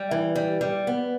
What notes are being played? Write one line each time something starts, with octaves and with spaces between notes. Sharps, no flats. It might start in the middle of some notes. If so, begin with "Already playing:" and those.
Already playing: G3
E3
G3
G3
B3